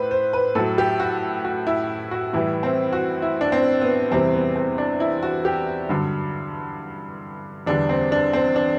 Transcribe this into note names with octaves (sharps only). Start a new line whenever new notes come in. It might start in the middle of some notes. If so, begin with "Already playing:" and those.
Already playing: A2 B4 C5
C5
B4
A2 F#3 A4
G4
F#4
F#4
E4
F#4
A2 E3 G3 E4
C4
F#4
E4
D4
C4
B3
E2 C3 E3 G3 C4
B3
C4
D4
E4
F#4
G4
G2 D3 F#3
E2 D3 G3 D4
C4
D4
C4
D4